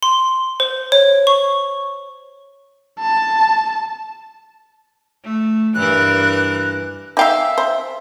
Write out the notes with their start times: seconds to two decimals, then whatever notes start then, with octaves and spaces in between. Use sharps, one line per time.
0.03 C6
0.60 C5
0.92 C#5
1.27 C#6
3.00 A5
5.24 A3
5.75 G2 E3 A#4 F#6
7.17 D#4 E5 F5 G5 D6
7.58 C5